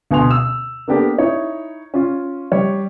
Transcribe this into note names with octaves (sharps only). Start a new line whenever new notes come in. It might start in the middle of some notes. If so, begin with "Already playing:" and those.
D2 B2 B4 G#5 C6 F7
E6
A#3 B3 D4 G4 A4 A#4
D#4 E4 C#5
C#4 F4
G3 C#5